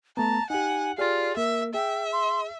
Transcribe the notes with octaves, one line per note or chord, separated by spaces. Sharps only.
A3 B3 A5 A#5
D#4 G4 F#5 G#5
F4 G4 G#4 D5 F6
A#3 A#4 E5
G#4 E5 G5
C6